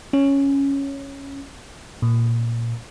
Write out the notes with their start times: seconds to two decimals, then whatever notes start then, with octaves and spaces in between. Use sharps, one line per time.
0.13 C#4
2.02 A#2